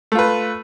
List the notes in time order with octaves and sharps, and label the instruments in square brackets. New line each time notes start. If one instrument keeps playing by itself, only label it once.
[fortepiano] A3
F4
B4